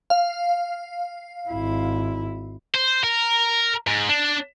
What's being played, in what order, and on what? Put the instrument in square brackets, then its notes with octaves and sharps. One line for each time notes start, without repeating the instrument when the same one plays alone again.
[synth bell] F5
[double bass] G#1 E4
[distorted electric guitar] C5
A#4
G#2
D4